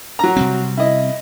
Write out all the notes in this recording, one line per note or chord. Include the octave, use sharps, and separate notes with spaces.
F#3 A#5
C3 G3 C4
E4 D#5